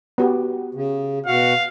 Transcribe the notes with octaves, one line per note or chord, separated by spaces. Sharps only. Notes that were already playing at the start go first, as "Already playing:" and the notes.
B3 F#4 G4
C#3
B2 F#4 F5 F#5